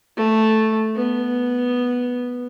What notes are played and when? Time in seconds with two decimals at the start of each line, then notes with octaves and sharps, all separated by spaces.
0.16 A3
0.96 B3